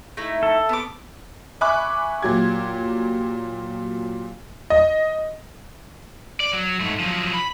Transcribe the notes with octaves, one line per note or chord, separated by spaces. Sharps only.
A3 D#4 E4
A4
B3 D6
E5 G#5 B5 C#6 D6 F#6
A#2 F#3 G4 G#6
D#5
D5
F#3
G#2 A3
F3 F#3
B5